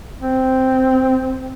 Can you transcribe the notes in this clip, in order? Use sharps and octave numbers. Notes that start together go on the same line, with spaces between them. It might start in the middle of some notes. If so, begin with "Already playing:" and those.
C4